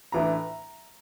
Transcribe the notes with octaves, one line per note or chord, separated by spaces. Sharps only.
A2 E3 A3 D4 A#5